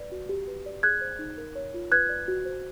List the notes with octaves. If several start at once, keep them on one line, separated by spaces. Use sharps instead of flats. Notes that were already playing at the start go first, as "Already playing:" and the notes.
Already playing: B4 D5
F#4
G4
B4
D5
G#4 F#6 G#6
C5
D#4
A#4
C#5
F4
B4 F#6 G#6
D5
F#4
C5